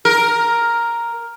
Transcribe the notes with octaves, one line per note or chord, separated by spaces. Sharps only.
A#4